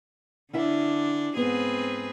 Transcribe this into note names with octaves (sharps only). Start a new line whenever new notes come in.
D3 C#4 D4 E4 E5
G#2 B3 C4 G#4 B4